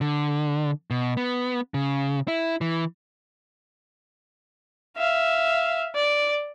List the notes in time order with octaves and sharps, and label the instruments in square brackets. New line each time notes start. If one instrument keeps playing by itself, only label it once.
[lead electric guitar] D3
B2
B3
C#3
E4
E3
[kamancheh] E5 F5
D5